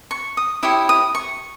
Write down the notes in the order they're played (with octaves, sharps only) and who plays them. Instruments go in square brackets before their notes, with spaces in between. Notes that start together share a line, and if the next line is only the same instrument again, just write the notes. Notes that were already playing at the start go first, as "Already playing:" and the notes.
[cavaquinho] C#6
D#6
E4 G4 C#5 D#6
D#6
C#6